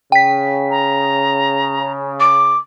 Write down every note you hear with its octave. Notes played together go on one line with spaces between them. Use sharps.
C#3 G5 B6
A#5
D6